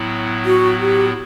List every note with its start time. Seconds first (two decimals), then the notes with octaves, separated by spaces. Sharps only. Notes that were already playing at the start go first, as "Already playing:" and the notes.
Already playing: A2 F#3 B3 E4
0.45 F#4
0.80 G4